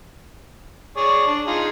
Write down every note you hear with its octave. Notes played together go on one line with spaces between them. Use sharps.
G#4 C#5 D5
D4
D#4 F4 G#4